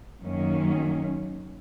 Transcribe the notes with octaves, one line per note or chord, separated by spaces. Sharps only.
F#2 D#3 F#3 A#3 C#4